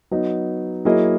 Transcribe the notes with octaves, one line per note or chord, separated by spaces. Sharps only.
F#3 B3 D#4
F#3 A#3 E4 G#4 D#5